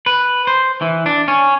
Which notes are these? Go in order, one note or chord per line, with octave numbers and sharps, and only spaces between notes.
B4
C5
E3
D4
C#4